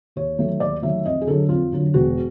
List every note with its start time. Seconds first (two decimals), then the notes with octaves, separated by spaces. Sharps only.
0.16 D#2 C#5
0.38 D#3 F#3 A3
0.60 D#2 D5
0.82 D#3 F#3 A3 E5
1.05 F2 D#5
1.21 G#4
1.27 D3 F#3 A4
1.49 F2 F4
1.72 D3 F#3
1.94 E1 F#4